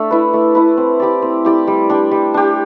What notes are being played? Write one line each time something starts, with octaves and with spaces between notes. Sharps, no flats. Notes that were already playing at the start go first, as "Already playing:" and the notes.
Already playing: A3 D4 A4 E5
E4 B4
A3
E4 B4
C4
E4 G4 D5
C4
E4 G4 D5
G3
D4 G4
G3
D4 G4